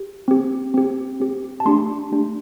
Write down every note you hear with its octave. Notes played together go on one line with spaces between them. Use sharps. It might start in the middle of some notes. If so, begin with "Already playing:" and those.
Already playing: G4
C4 G4
C4 G4
C4 G4
A5
A3 D4 G4 C6
A3 D4 G4